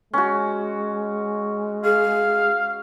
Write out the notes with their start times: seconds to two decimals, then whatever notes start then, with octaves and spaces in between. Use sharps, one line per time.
0.13 G#3 C#4 F#4
1.84 G#4 F5